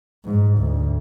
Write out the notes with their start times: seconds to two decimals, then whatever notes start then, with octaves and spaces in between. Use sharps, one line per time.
0.24 G#2
0.58 D2